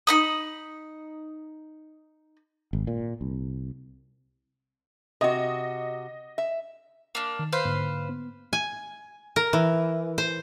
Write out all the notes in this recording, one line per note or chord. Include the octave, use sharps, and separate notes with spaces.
D#4 B5 D#6
G#1
A#2
C2
C3 F#4 D#5
E5
A#3 D4
D#3
B4 C5 F5 G6
G#2 D3 A#3
B3
G#5
A#4
E3
C5